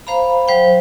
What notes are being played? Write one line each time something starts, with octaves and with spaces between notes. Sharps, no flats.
C5 F5 A#5 B5
F#3 C5 F5 G5